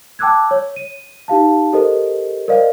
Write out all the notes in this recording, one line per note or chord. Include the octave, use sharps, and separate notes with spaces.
G5 A5 D6 E6 F#6 G#6
C#5
D#7
D#4 G4 F5 A5
G4 A4 A#4 C5 D#5
A#4 C5 D5 D#5 F5